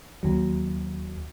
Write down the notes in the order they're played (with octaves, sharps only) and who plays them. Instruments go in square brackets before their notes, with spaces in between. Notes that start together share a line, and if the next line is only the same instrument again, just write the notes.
[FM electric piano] D#2 F#3